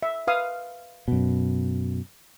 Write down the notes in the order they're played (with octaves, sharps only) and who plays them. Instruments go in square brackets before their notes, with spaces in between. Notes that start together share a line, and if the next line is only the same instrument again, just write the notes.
[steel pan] E5
B4 F5 D#6
[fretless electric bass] F#2 B2